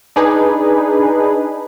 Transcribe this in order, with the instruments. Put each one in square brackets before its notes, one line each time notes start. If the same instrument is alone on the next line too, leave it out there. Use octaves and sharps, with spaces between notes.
[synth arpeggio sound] D4 D#4 G#4 B4